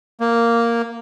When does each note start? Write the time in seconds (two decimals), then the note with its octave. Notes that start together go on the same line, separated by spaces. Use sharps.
0.20 A#3